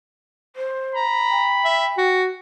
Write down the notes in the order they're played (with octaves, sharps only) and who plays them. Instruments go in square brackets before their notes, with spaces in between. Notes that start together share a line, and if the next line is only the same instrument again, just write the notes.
[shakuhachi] C5
[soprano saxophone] A#5 [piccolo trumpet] B5
[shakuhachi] G5
[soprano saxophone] E5
F#4